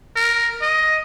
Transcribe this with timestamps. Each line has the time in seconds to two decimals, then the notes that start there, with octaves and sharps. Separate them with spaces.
0.16 A#4
0.62 D#5